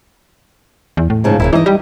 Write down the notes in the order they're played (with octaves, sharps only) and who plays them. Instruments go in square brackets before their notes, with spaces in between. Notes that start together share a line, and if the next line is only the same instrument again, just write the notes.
[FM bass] E2
A2
[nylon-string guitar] G#2 C#3 F3
[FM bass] D1 [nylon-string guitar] C#3 A#3 E4
[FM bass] E3 [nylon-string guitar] D#4 E4 D#5
[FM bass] G3